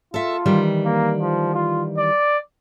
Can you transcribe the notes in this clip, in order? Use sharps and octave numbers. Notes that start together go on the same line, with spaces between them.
F4 A4 E5
D#3 E3 G3
A#3
F3
F4
D5